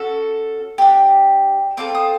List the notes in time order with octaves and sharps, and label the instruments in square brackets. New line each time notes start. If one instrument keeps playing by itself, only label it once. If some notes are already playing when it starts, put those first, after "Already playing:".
Already playing: [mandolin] C#4 F#4 A4
D4 G4
C4 F4 A4 D6
D#6